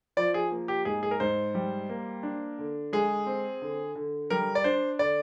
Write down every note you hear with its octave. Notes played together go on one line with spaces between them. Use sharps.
F3 D5
G#4
A#3
G4
G#2 G#4
G#4
A#4
G#2 C5
G3
A#3
D4
D3
G#3 G#4
C4
D3
D3
G3 A#4
D5
D4 C5
D3 D5